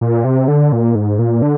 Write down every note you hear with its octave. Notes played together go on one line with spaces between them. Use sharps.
A#2
C3
D3
A#2
G#2
A#2
D3